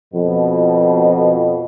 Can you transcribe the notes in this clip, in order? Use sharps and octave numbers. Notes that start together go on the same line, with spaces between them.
F2 B2